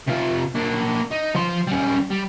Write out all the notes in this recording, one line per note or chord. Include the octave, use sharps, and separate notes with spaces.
C3 F4
A#3 D4
D#4
F3 C6
G3 C#4
G3